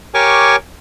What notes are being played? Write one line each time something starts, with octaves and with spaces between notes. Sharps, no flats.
G4 A#4 C#5 G#5 C#6 D6